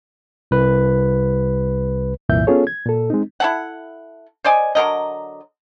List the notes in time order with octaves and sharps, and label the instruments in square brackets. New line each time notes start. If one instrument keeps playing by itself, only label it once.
[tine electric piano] C2 B4
[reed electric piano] C2 F#2 A#2 E3 E5 G6
B3 C#4 F4 G#4 A4 C#5
G#6
A#2 A4
G#3 C4 D#4
[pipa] E4 A4 F#5
C5 D5 D#5 G#5
D3 F#3 A#4 D#5